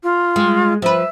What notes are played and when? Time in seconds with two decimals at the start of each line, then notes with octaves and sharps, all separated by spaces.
0.03 F4
0.36 G#3
0.82 F3 B4 E5